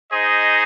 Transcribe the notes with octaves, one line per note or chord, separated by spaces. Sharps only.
D#4 G#4 C5 D#5